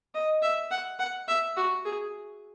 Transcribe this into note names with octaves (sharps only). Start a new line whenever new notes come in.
D#5
E5
F#5
F#5
E5
F#4
G#4